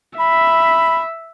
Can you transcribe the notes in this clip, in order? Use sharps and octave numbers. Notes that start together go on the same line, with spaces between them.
E5 B5